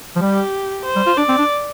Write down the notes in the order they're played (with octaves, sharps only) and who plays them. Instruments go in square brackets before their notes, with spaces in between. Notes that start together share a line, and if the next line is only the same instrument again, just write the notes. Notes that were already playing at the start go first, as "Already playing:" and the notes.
[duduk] F3
[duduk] G3 [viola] G4
[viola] C5
[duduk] G3
F4
[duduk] D4 [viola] D5
[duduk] C4
D4